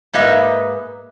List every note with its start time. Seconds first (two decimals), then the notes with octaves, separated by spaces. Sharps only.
0.13 G#2 A#3 B4 D#5 E5